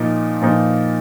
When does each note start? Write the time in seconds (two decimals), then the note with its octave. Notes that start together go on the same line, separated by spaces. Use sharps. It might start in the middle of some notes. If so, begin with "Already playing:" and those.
Already playing: A#2 F3 A#3 D#4
0.42 A#2 F3 A#3 D#4